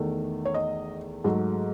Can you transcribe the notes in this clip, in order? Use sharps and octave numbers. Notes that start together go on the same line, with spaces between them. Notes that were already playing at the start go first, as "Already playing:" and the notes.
Already playing: E2 D#3 A3
C#5
D#5
G#2 F#3 A3